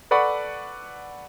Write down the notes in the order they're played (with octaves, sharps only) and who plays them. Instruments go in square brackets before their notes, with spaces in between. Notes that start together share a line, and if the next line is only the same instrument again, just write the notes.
[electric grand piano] A4 B4 D5 F#5 B5 C#6